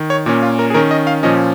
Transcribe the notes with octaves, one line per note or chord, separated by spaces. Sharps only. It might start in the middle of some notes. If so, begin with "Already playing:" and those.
Already playing: D#3
C#5
A#2 A#3 C#4
F4
A#4
G#4
D#3 C#4 A#4
D#5
F5
A#2 F3 C#4 D#5